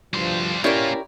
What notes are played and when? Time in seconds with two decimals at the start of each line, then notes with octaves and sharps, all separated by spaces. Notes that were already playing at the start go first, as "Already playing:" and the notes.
0.14 D2 G2 F3 G3 C5
0.64 A#3 C#4 E4 F4 G4 A#4 C#5 D5